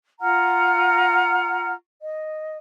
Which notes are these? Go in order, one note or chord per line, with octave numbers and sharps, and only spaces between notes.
F4 F#5 A#5 F6
D#5